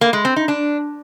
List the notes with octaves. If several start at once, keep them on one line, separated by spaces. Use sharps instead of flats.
A#3
G#3
C4
D#4
D4